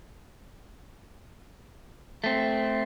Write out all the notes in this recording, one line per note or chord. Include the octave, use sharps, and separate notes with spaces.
A3 C4